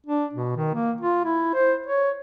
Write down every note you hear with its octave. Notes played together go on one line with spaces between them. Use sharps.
D4
B2
D#3
A#3
F4
E4
C5
C#5